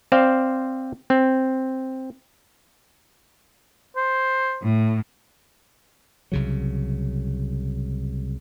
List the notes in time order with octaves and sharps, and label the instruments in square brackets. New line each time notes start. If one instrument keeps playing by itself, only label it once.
[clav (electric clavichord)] C4 C5 D5 F5
C4
[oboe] C5
[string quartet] A2
[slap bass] C2 C#3 F#3